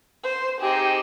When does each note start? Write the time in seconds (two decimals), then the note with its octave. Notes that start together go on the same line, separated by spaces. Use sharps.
0.24 C5
0.61 C4 D#4 G4 G#4